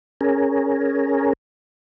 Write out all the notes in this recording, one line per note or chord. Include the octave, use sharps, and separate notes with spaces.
C#4 G#4 A#4